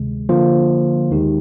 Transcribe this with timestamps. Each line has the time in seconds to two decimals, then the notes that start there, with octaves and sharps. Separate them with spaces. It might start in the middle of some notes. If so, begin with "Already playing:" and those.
Already playing: D2 C3 D#3 G#3
0.29 D3 F3 A#3 F4 C5
1.11 D#2 D#3 G#3 D#4 G4